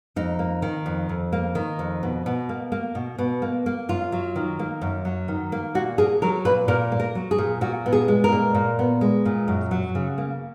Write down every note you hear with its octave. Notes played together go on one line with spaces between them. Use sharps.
F2 D#4
A#3
D#3
F2
F2
A#3
D#3
F2
B2
B2
A#3
A#3
B2
B2
A#3
A#3
F#2 F4
F#3
D#3
A#3
F#2
F#3
D#3
A#3
A#2 F#4
A#3 G#4
F#3 A#4
A#2 B4
A#2 A#4
A#3
A#4
F#3
G#4
A#2
A#2 F#4
B3
G#4
G#3
A#4
A#2
A#2
B3
G#3
A#2
F#2
F#3
C#3
A#3